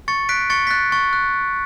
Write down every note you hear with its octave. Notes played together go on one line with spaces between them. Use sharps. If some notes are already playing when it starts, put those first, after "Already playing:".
C#6 A6 C#7
F#6 B6 D7
C#6 A6 C#7
B6
F#6 A6
C#6 A6
F#6